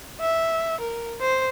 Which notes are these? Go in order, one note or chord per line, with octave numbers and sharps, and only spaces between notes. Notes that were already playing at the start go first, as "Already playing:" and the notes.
E5
A#4
C5